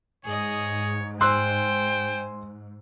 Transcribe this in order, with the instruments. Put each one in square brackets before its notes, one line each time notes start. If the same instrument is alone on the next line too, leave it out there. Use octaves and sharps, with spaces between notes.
[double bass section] G#2 [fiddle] G#4 D#5 [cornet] C#5
[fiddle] C5 G#5 [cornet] G5 [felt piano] C6 E6 F#6